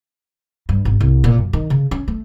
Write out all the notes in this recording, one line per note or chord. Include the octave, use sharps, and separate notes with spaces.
G2
G#1
C2
A#2
F#2
D#3
C#3
C#4
A3